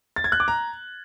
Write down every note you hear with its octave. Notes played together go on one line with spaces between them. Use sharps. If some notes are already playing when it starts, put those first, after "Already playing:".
A6
G#6
F#6
D6
A#5